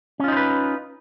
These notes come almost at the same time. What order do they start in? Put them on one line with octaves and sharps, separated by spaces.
C#4 F4 D#4 C5 B4